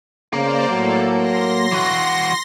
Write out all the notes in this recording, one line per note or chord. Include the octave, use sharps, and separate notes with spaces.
C#3 A#3 A#4 C5 D5
A2 F#3 A4
C6 A#6
E3 F#4